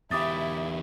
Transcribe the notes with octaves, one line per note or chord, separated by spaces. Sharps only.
E2 E4 G4 E5 D6 D#6 A6